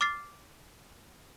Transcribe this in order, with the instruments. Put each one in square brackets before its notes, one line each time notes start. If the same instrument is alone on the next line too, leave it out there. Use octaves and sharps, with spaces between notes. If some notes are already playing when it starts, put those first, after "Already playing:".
[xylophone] D6 F6 A6 C7